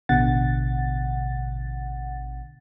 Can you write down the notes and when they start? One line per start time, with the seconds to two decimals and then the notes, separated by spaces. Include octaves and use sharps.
0.09 A1 B2 D3 F#5 A6